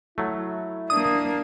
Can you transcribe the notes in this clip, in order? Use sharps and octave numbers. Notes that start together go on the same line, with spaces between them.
F#3 A3 E4
A#3 D4 D#6